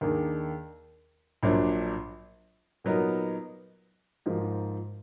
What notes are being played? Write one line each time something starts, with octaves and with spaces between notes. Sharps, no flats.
D#2 D#3 A#3 D4 G#4
A#1 A#2 F#3 D4
A#2 F#3 B3 D#4 A#4
G#2 F3 A#3